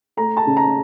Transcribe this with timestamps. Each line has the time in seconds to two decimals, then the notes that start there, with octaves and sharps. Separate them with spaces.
0.17 A3 A#5
0.37 A5
0.47 C#3
0.57 A#5